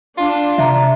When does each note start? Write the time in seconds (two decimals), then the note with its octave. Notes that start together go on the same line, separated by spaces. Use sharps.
0.18 D4 F4
0.58 C3 E5 A#5